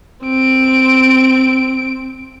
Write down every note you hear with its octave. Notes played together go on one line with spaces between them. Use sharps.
C4 D7